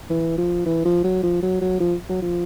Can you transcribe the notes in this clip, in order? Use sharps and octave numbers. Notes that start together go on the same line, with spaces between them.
E3
F3
E3
F3
F#3
F3
F#3
F#3
F3
F#3
F3